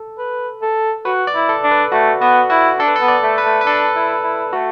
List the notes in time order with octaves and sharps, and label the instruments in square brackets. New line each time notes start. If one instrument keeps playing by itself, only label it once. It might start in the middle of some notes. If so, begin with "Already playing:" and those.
Already playing: [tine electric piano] A4
[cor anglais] B4
A4
[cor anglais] F#4 [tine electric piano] B4
[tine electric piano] D5
[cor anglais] E4
[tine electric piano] A4
[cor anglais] D4
[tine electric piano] B4
[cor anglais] A3 [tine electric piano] F#4
[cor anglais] B3 [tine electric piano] F#4
[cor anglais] E4 [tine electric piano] F#4
[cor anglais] D4 [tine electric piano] A4
[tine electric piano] B4
A4
[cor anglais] B3
[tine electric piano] D5
[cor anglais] A3
[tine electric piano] B4
[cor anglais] A3
[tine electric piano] B4
[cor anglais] D4 [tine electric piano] A4
[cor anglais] E4
E4
[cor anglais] A3 [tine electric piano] F#4